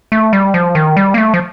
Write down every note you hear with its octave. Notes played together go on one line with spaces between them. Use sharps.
A3
G3
F3
D#3
G3
A#3
A3
F3